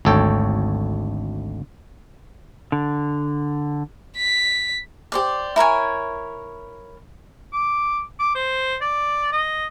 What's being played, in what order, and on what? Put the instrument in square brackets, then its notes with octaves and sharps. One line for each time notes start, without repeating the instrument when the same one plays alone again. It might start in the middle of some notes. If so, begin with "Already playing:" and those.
[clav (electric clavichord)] G#1 D2 A4 C#5 G5
[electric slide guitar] D3
[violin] B6
[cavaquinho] G4 C5 D5
E4 A#4 C#5 G#5
[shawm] D6
D6
C5
D5
D#5